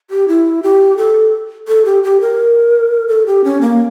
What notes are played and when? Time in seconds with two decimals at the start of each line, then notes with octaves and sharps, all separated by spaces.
0.10 G4
0.28 E4
0.63 G4
0.97 A4
1.68 A4
1.85 G4
2.03 G4
2.21 A#4
3.08 A4
3.26 G4
3.44 C#4
3.61 A#3